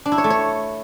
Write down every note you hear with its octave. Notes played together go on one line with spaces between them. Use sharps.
D4
E4
C#5
A3
C#5